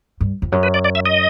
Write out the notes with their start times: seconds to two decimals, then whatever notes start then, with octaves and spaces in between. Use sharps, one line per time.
0.21 G2
0.42 F2
0.52 F#2
0.63 B4
0.74 D5
0.84 D5
0.95 E5
1.06 D#5